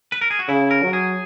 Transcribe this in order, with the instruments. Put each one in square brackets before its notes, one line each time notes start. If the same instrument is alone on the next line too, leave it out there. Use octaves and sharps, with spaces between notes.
[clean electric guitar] B4
A#4
G#4
F#4
[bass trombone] C#3 [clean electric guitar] E4
[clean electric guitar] A#4
[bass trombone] F#3
[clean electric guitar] G#4